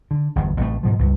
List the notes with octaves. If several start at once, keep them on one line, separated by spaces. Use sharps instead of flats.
D3
G1 E2
A1 C3 G3 A3
G#2 B2 F3
C#2 G2